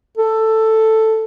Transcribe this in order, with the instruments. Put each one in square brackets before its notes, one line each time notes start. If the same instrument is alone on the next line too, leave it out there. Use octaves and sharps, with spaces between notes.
[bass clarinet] A4